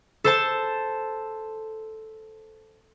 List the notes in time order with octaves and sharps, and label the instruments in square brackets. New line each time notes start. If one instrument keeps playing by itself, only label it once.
[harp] A4 C5 A5